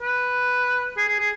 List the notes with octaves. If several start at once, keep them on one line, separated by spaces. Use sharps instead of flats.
B4
G#4
G#4
G#4